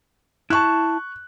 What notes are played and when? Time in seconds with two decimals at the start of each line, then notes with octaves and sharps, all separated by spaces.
0.50 E4 A5 C#6 F#6